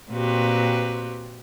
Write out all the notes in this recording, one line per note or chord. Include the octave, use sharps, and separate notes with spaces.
A#2 C4 F#4 G4 B4